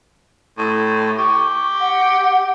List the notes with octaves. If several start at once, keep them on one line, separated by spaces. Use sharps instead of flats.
A2
G4 C#6
F#5